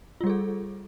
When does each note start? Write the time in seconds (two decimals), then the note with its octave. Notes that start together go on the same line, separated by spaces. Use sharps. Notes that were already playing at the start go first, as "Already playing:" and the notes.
0.21 F4
0.24 G3
0.27 G#4
0.30 A4